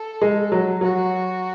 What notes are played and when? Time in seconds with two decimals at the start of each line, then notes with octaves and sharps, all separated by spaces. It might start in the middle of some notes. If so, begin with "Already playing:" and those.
Already playing: A4
0.21 G#3
0.52 F#3
0.81 F#3 F#4